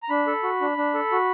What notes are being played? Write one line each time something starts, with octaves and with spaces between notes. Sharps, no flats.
A#5
D4 B5
A4
F#4
D4
D4
A4
F#4